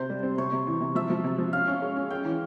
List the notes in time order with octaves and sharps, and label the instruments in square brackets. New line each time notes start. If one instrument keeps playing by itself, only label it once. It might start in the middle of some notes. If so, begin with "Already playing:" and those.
Already playing: [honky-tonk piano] C3 [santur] C5
[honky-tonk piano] G3
C4
[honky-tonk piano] C3 [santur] C#5
[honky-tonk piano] C3
E3
C3
[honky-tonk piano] F3 [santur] E5
[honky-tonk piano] F3
C3
F3
[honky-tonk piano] C#4 [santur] F5
[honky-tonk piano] C#4
G#3
C#4
[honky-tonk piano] G#3 [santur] G5
[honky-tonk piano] E3